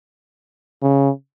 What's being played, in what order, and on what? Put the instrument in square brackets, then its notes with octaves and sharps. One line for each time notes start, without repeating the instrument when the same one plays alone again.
[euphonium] C#3